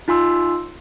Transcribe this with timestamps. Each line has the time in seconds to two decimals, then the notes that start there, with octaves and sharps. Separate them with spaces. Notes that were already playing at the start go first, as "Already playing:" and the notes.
0.08 D#4 F4 G#5 C6 E6